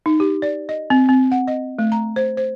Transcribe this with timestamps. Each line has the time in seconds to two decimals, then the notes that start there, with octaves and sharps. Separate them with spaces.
0.06 D#4
0.20 G4
0.42 D5
0.69 D#5
0.90 C4
1.09 C4
1.32 F#5
1.48 D#5
1.79 A3
1.92 A#5
2.16 C5
2.37 C5